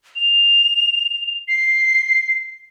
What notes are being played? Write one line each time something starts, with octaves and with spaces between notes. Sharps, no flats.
F7
C7